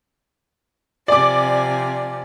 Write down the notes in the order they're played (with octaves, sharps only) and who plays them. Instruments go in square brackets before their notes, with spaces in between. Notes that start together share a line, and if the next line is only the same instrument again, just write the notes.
[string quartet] C3 F3 G#5 [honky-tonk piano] D5 D6